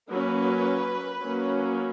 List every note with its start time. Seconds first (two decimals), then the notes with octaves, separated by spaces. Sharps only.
0.11 F#3 A#3 C#4 B4
1.22 F#3 A#3 C#4